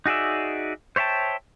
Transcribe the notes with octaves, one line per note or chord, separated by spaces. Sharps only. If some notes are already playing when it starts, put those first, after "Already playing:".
D#4 F#4 G#4 D5 E5
C5 C#5 E5 G5 A5